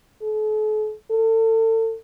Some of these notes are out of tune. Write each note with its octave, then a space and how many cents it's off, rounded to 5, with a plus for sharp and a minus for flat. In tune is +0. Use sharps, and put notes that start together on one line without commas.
A4 -45
A4 +35